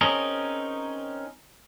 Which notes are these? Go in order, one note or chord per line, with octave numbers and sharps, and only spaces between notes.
C4 C#4 D#4 G#4 A#4